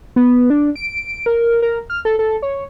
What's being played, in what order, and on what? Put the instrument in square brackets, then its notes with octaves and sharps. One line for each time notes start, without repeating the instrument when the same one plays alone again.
[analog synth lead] B3
D4
D7
A#4
A#4
F6
A4
A4
C#5